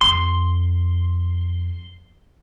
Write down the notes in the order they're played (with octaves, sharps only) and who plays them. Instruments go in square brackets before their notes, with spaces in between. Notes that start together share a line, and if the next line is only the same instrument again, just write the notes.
[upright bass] F2 [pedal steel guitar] C6